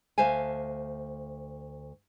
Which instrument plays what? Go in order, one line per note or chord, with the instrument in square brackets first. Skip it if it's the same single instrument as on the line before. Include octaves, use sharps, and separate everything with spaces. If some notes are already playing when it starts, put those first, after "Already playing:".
[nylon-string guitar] D2 C5 E5 F5 G#5